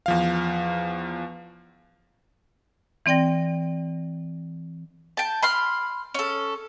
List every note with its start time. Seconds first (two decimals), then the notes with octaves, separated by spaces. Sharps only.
0.06 E2 F3 F5
3.06 E3 C4 D5 G5 A#6
5.17 G5 A5
5.43 B5 C6 F6
6.15 C#4 A4